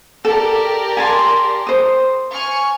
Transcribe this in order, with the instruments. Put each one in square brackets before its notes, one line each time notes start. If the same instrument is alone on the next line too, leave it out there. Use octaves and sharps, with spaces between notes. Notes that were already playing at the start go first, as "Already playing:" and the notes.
[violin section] G4 A#4 D5 [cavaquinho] A4
[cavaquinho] G#5 A5 C6
C5 D#6
[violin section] G#5 C#6 F6